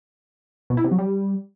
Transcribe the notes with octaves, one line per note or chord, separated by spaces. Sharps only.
B2
E4
C3
F#3
G3